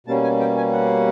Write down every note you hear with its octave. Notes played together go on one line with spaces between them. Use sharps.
B2 G3 A#3 C#4 A5
G#5
G5
G#5
F#5